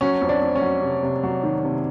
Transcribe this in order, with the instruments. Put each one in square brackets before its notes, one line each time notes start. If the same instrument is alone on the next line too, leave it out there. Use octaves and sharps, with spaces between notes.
[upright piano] F#3 C#4
F2
D4
F2
C#4
F#3
C3
C3
F#3
D#3
C3